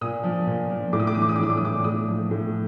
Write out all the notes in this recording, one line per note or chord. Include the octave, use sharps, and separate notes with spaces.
A#2 D#6
F3
A#2
F3
A2 D6
D#6
D6
E3 D#6
D6
D#6
D6
A2 D#6
D6
D#6
E3 D6
A2 D#6
F3
A2